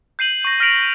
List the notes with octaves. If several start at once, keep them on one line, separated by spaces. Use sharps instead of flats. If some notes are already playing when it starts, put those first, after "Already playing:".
G6 C7 D#7 F#7
C#6 A#6
F6 A#6 B6 D7 F7 F#7